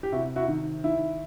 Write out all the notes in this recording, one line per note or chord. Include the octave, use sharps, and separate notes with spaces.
G4
C3 E4 F#4
E4 F#4
D#3
D#3 E4